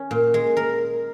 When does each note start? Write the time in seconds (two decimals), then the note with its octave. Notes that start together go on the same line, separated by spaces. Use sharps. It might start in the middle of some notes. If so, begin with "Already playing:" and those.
Already playing: C#4
0.11 A#2
0.34 G#3
0.57 A#4